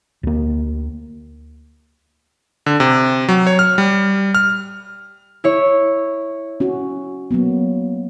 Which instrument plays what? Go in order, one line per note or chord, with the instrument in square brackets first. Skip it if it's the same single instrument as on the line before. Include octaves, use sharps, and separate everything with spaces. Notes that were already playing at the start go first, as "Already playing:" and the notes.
[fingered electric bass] D2 A#3
[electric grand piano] D3
C3
F#3
C#5
F6
G3
F6
[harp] E4 C#5
[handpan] C#4 F#4
F#3 A#3 B3